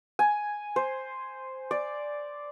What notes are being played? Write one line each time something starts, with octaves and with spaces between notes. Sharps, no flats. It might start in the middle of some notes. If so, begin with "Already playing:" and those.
G#5
C5
D5